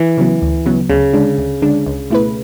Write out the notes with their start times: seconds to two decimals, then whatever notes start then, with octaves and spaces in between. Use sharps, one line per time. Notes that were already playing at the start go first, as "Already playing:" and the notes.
Already playing: E3
0.18 C#3 F#3 B3
0.42 D2
0.66 C#3 F#3 B3
0.90 D2 C#3
1.13 D3 G#3 D4
1.38 D2
1.62 D3 G#3 D4
1.86 C#2
2.10 B2 A3 E4 B4